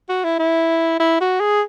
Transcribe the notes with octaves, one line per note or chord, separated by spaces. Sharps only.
F#4
E4
E4
E4
F#4
G#4